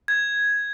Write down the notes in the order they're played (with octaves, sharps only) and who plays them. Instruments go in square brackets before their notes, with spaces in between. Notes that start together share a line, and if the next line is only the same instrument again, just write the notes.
[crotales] G#6